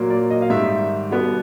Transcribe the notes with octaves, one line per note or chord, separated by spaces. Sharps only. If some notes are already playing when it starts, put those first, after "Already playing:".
Already playing: A#2 F#3 A#3
D5
D#5
F5
G#2 D#3 G3 E5
B2 G3 B3